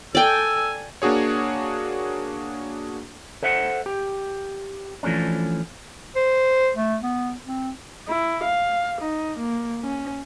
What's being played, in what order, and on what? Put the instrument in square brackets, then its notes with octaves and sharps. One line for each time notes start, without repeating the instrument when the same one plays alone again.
[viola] A4 G#5 [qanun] D5 G5 [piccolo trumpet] E6
[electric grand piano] A#3 D4 F#4 G#4 C#5
[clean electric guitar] A4 C5 E5 F#5
G4
E3 F3 A3 C#4 D4
[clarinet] C5
A3
B3
C4
[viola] E4
F5
D#4
A#3
C#4